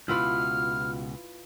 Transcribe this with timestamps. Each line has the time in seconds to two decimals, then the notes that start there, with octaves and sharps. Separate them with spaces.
0.08 C#2 B2 E4 F4 B4 F6